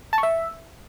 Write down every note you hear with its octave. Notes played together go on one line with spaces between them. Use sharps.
A5
C#6
E5